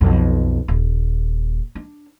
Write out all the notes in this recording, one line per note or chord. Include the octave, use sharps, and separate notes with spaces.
B1 F2
D#1
D4